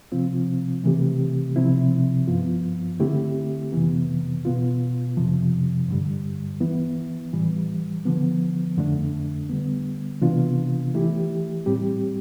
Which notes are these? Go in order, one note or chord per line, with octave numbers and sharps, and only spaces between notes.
C3 F3 C4 F4
C3 E3 A3 C4 G4
C3 F3 C4 E4
G2 F3 B3 F4
D3 A3 C4 E4 G4
F2 C3 E3 B3
B2 B3 F4
F2 C3 F3
G2 D3 G3
E3 B3 E4
A2 E3 G3
D3 F3 B3
F2 D3 A3 D4
D3 G3 B3
C3 E3 B3 D4 F4
E3 A3 E4 G4
A2 G3 C4 G4